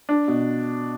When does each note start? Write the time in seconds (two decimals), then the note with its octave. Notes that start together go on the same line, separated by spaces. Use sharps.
0.09 D4
0.28 B2